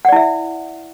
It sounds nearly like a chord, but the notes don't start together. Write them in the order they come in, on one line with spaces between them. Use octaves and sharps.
F#5 D5 E4 E5